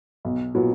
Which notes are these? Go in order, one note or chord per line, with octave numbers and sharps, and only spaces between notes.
B1
A#2 F#3 B3